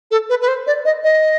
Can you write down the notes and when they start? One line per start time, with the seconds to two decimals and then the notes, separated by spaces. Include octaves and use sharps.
0.11 A4
0.30 B4
0.41 B4
0.48 C5
0.67 D5
0.85 D#5
1.04 D#5